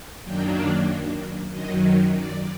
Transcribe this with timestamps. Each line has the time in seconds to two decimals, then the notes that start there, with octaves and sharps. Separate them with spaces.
0.23 F#2 D#3 F#3 A#3 D4 G5
1.50 F#2 D#3 F#3 D#5
2.12 D5